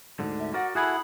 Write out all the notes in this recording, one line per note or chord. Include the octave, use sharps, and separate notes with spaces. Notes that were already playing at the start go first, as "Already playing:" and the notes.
D2 G#2 D3
E5
F#4 A#4 D5 F#5
E4 F#4 G#4 A4 F#5 G#5 B5